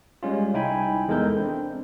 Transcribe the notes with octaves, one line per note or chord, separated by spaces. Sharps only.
G3 G#3 C#4 F4
C2 D#4 E4 G5 G#5 B5
E2 G#3 A4 A#4 G6
C4 D4